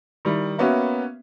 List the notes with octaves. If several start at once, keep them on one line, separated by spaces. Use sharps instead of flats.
D#3 G3 E4
A#3 B3 C#4 F#4 E5